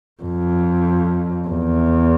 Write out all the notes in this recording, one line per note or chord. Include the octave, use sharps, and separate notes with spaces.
F2
E2